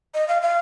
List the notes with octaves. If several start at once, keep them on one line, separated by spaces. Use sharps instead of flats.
D#5
F5
F5